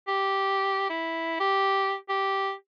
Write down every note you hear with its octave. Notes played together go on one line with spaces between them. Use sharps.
G4
E4
G4
G4